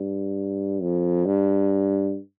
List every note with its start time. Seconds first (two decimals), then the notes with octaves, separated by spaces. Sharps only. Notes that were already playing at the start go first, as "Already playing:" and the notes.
Already playing: G2
0.82 F2
1.26 G2